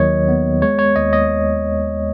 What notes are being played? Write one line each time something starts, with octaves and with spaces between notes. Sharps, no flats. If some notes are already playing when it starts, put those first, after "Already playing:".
Already playing: D#2 D#3 F#3 C#5 D#5
B3
G#3 C#5
C#5
D#2 D#5
D#5